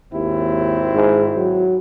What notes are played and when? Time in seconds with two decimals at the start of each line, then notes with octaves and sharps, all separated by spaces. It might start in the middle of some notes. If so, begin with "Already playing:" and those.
0.14 G#1 D#2 C4 E4
0.95 G#2
1.37 F#3